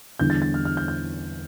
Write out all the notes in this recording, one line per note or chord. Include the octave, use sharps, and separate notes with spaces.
E2 D3 G3 D4 G6
A6
A6
F6
F6
G6
G6